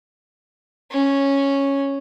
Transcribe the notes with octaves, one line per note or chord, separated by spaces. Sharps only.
C#4